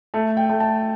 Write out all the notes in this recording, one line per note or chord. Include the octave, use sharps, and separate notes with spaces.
A3 A5
G5
A3
A5